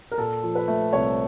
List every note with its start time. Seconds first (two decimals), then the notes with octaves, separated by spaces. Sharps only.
0.12 A#4
0.17 A#2 A4
0.43 F3
0.55 B4
0.68 A3
0.93 C2 C#5